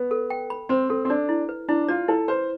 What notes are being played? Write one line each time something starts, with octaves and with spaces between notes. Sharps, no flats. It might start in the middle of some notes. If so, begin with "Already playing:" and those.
Already playing: B3
A4
G5
B5
C4 C5
C4 A4
C4
D4 D5
E4
B4
D4 E4
F4 D5
E4 A4
B4 C5